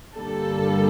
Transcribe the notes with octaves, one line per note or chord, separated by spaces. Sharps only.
G2 D3 G3 A#3 A4